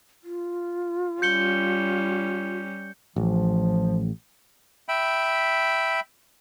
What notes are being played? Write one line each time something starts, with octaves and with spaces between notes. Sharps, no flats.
F4
G3 C#4 G6 C#7 G7
A1 F3
E5 G5 B5